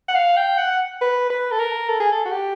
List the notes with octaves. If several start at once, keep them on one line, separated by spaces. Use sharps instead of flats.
F#5
F5
G5
F#5
B4
B4
A4
A#4
A4
G#4
A4
F#4
G4